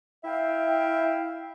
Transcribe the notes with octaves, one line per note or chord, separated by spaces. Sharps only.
E4 E5 F5 G5